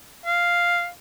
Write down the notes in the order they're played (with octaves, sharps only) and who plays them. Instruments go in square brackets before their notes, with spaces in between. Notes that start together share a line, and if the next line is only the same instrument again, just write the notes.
[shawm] F5